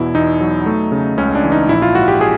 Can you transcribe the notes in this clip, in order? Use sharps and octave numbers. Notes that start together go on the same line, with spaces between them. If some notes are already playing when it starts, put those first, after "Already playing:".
Already playing: E2 B2 E4
E2 D#4
F#3
A3
C#3
C#2 C#4
D4
E3
D#4
A#1 E4
F4
G#2 F#4
G4
G#4